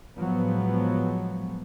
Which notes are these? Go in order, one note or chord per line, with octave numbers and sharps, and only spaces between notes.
A2 F3 F#3 G#3 B3